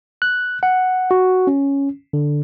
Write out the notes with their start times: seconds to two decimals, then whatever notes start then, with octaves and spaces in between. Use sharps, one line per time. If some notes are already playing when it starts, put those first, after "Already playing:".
0.22 F#6
0.63 F#5
1.11 F#4
1.47 C#4
2.13 D3